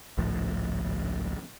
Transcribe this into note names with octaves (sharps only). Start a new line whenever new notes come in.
G#1 C#2 A2 F3